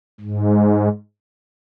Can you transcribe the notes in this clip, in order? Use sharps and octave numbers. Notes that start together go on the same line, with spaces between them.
G#2